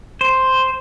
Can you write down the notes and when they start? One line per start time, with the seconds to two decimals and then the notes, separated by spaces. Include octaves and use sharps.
0.21 C5